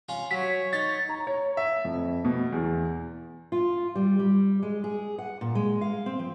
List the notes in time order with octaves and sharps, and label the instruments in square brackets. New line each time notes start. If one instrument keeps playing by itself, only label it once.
[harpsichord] C#4 F4
[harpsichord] F#3 [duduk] C#5 [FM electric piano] B6
[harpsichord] D#4 [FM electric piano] A6
[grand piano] A#5
C#5
E5
F2
B2
E2
[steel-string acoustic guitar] F4
G3
G3
G#3
G#4
F#5
A#2
G#3
F5
C4
F3